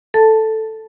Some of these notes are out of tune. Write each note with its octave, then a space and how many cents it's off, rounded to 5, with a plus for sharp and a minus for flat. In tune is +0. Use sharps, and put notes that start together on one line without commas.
A4 +0 A5 +0